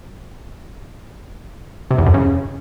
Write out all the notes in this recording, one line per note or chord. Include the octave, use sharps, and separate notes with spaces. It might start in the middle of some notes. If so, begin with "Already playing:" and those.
C3
E2
F#2
C#3